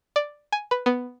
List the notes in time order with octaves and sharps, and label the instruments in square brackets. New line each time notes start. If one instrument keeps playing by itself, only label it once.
[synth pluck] D5
G#5
B4
B3